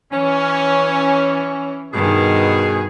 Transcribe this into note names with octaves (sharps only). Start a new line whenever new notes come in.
E3 C#4
G2 B2 D#3 G#4